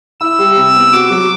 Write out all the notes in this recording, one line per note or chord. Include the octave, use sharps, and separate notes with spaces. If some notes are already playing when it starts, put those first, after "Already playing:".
E4 E6
G3
C3
B3
F#4 D6
F#3